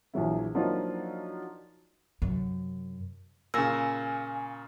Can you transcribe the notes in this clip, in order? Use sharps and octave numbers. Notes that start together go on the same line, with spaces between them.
A#1 E3 F#3 E4
F3 F#3 A#3 D4 D#4 F4
F#2 C3
A#2 C#3 G#5 E6 A#6